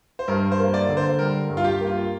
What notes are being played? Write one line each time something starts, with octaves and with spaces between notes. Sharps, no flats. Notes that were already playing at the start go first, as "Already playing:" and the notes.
C5
G2 A#4
C5
A#3
D5
D3
C5
G3 A#4
G2
F4
G4
A#3
F4